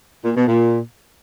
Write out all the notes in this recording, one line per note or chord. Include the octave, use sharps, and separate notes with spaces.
A#2
B2
A#2